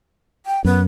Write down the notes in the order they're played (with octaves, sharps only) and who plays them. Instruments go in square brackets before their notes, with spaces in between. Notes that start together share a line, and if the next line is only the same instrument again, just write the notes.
[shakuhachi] G5
[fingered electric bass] F#2 [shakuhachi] B3